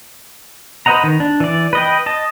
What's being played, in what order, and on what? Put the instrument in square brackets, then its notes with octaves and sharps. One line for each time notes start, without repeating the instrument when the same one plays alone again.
[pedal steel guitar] B4 C5 D#5 F#5 A#5
D#3
D4
E3 D5
B4 D#5 G5
D#5 A5